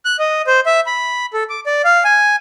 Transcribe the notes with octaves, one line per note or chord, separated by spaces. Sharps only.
F#6
D#5
C5
E5
B5
A4
D6
D5
F5
G#5